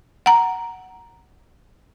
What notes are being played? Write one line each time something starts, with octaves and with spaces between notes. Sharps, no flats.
F#5 A#5